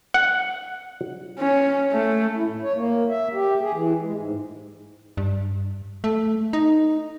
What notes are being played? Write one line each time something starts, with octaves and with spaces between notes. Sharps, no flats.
F#5
C#4
A3
E4
A2
C#5
A#3
E5
G4
G#4
E3
G#3
G#2
G2
A3
D#4